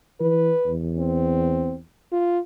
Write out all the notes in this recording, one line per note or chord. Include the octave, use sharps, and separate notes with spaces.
E3 B4
E2
C4
F4